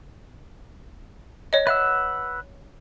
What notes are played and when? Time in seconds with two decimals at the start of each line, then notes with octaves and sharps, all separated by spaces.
1.53 C#5 D#5
1.67 B4 E5 F#5 E6